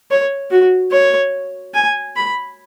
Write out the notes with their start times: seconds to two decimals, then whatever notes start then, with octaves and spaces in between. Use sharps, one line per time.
0.11 C#5
0.51 F#4
0.92 C#5
1.74 G#5
2.16 B5